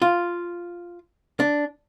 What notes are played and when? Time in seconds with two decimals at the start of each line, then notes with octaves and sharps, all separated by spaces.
0.02 F4
1.40 D4